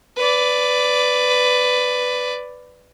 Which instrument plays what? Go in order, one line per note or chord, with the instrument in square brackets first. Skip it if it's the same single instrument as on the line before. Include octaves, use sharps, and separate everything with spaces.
[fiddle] B4 D5